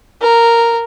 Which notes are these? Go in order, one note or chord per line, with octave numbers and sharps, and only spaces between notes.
A#4